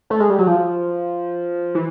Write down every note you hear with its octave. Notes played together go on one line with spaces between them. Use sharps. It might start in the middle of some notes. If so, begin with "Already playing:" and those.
A3
G#3
G3
F#3
F3
E3